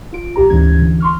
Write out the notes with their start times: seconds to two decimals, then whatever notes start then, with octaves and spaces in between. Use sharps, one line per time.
0.13 F4 D7
0.36 B1 G4 A#5
0.50 D2 G#2 E3 C#4 G#6
0.79 D3 E3
1.00 C6 C#6 F6